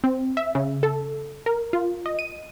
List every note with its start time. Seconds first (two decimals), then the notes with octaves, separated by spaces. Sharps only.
0.04 C4
0.37 E5
0.55 C#3
0.83 A4
1.46 A#4
1.73 F4
2.06 D#5
2.19 D#7